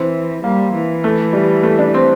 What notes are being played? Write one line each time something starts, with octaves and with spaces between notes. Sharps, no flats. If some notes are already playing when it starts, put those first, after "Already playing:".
Already playing: E3 C4
G3 A#3
E3
A3
G3
A3
D4
C4